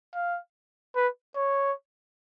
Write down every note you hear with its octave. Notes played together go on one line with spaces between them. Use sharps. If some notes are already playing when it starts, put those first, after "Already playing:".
F5
B4
C#5